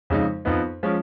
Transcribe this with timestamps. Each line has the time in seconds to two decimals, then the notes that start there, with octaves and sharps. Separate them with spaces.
0.10 F2 C#3 G#3 D#4
0.45 F2 F3 B3 D#4
0.83 F3 G#3 C#4